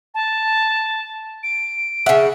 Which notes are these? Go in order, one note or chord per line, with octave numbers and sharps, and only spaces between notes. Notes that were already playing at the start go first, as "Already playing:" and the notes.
A5
D7
C#3 E5 F#5